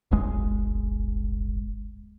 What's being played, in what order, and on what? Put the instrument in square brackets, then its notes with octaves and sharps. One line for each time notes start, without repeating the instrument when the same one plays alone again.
[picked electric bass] D1 G1 G#3